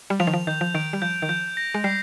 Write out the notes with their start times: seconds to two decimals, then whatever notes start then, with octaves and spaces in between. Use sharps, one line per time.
0.10 G3
0.20 F3 F7
0.27 D#3
0.33 F3
0.47 D#3 G6
0.61 F3
0.75 D#3 D7
0.93 G3
1.02 F3 G6
1.22 D#3
1.29 F3 G6
1.57 A#6
1.74 G#3
1.84 G3 C7